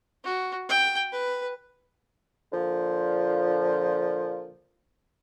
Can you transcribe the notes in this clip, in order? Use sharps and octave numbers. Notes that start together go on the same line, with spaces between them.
F#4
G5
B4
A#2 D3 F3